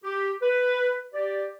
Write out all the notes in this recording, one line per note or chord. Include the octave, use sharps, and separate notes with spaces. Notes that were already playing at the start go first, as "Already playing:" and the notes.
G4
B4
G4 D5